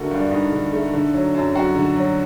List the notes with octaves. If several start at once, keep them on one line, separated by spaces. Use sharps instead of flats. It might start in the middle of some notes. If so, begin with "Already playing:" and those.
Already playing: D3 A3 F#4 A#4
G2 D4
G2 D#4
D3
A3
D3
F#3
F#2
F#2 F#4
D3
F#3